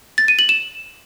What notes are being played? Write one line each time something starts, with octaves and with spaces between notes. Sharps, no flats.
A6
D#7
F#7
E7